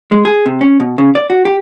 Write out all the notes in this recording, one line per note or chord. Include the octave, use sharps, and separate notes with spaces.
G#3
G#4
C3
C#4
B2
C#3
D5
F#4
G4